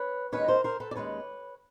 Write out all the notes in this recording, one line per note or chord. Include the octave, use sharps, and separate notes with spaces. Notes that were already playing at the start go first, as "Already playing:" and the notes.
Already playing: B4 C#5
D#2 D#3 G#3 C#4 B4 C#5
A#4 C5
A#4 C5
A4 B4
D5
D#2 D#3 G#3 C#4 B4 C#5